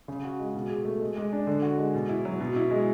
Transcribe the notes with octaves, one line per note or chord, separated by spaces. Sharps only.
C#3
F#4
G#3
B2
G#4
A3
G#3
G#3
D4
D3
F#4
G#3
B2
E4
F#3
B2
E4
G#3